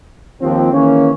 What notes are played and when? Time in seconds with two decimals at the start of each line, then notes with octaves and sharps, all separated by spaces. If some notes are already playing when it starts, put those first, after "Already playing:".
0.41 D#2 F3 C4
0.72 D#3 E3 G#3 A#3 C#4